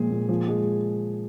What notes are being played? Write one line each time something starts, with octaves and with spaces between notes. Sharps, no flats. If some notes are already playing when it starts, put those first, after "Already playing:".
Already playing: A#2 F3 G#3 G#4
A#2
F3
G#3